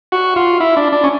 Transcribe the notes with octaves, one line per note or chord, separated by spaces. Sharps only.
F#4
F4
E4
D4
D4
C#4